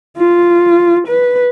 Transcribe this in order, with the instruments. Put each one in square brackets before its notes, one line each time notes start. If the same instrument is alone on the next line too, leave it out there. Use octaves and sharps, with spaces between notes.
[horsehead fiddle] F4
B4